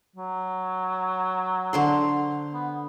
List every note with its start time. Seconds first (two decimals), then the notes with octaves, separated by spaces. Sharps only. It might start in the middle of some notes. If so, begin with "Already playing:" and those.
0.16 F#3
1.73 D3 C5 C6
2.54 B3